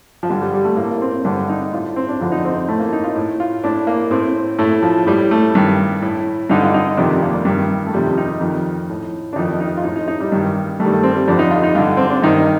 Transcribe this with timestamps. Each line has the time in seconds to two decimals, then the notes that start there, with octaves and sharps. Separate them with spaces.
0.23 F3
0.29 G2 D3 G3
0.42 G3
0.54 G3
0.65 A3
0.77 A2 A#3
0.91 A#3
1.01 C4
1.25 G2 D3 D4
1.49 D#4
1.73 A2 F4
1.96 C4
2.09 D4
2.21 F2 D3 F4
2.32 D#4
2.45 C4
2.68 A2 A3
2.79 A#3
2.93 D#4
3.04 F4
3.16 A2
3.40 F4
3.64 A2 D4
3.87 A#3
4.11 A2 C4
4.59 A2 A3
4.83 F3
5.07 A2 G3
5.31 A3
5.55 G2 D#3
6.02 A2
6.50 G2 D3 D#4
6.62 F4
6.74 D#4
6.97 F2 C3 D#3 D4
7.22 A#3
7.34 G3
7.45 G2 D#3
7.86 A3
7.93 F2 C3 D#3 G3
8.18 D#4
8.41 F2 D#3
8.89 A2
9.33 D4
9.36 F2 D#3 D#4
9.60 D#4
9.77 F4
9.84 A2 D#4
9.96 D#4
10.08 D#4
10.21 G3
10.32 G2 D#3
10.80 G2 A3
10.84 D#3 G3
10.92 A3
11.03 C4
11.16 G3
11.28 F2 D3 D4
11.39 D#4
11.51 F4
11.63 D#4
11.75 G2 D3 F4
11.97 C4
12.10 D4
12.22 G2 D#3 D#4